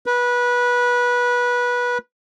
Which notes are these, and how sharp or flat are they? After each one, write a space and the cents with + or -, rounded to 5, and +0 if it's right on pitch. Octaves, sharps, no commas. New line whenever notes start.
B4 -20